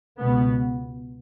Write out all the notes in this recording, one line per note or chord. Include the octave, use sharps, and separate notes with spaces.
C#2 B2 B3